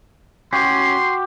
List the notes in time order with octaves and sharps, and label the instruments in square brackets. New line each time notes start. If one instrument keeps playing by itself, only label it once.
[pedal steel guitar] C#4 [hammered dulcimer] F#4 G4 [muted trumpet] C6 [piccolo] C7